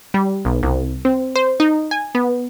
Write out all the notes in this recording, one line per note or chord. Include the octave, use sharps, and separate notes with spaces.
G3
B1
C2
C4
C5
D#4
G#5
B3